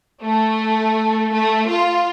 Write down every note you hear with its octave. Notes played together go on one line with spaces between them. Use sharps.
A3
A3
F4